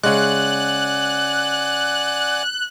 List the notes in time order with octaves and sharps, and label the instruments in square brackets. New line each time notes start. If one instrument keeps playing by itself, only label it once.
[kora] C#3 G#3 [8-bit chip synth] D5 F#5 G#5 [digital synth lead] F#6